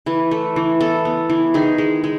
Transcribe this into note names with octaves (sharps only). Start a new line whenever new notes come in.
E3 B4
A3
E3
B3 A4
B3
E3
D#3 G#4
G#3
G#3